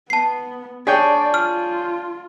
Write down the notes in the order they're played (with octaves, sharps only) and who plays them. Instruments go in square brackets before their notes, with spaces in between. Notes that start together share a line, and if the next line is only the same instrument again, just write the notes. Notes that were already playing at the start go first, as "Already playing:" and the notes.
[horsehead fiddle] B3 [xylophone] A5 C7
[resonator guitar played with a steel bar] D4 [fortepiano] G#4 C#5 G5 [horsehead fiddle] D5
[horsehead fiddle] F4 [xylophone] F6